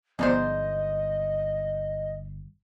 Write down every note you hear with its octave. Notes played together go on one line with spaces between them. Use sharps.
G1 F3 G#3 B3 D#4 C5 D5 D#5